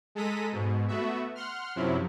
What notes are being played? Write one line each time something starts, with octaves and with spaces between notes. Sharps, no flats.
G#3 A4 A#5 B6 D#7
G#2 B2
A3 B3 F#4 E5
F#5 C6 F6
F#2 C3 F3 F#3 E4